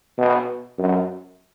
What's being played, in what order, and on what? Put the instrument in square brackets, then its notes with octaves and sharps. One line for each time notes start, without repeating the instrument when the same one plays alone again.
[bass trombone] B2
F#2